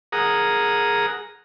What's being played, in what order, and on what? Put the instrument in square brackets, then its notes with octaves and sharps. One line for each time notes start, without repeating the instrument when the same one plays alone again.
[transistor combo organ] G#4 A#4 F#5 A#5 D#6